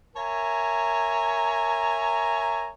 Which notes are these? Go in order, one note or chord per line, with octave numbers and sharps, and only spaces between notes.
A#4 C#5 E5 G#5 A#5